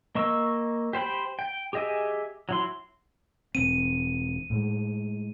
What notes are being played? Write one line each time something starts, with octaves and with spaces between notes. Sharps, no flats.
A#3 D#5 C#6 E6
G4 C5 G5 B5
G5
G4 G#4 D#5 E5 G#5
F#3 E4 C6
E1 C4 D#7
A2 G#3